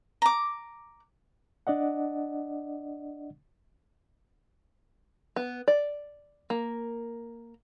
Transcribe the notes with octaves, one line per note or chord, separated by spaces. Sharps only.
A#5 D6
D4 D5 D#5 F#5
B3
D5
A#3